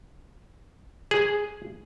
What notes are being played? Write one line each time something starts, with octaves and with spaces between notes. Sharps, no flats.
G#4